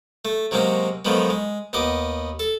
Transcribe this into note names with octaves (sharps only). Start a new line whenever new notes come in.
A3
C3 F#3 G#3 A#3 C4 C#4
D3 D#3 F3 F#3 G#3 B3
G#3
D#2 B3 D#5 D6
A4